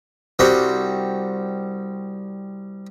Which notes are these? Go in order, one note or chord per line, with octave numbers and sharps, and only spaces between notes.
C2 G3 C4 F#4